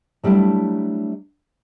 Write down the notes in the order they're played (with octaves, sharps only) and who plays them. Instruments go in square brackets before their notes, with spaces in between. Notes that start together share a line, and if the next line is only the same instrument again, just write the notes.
[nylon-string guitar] F#3 G3 A3 D4 E4